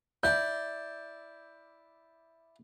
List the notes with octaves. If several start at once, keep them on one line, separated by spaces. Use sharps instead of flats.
E4 D5 G6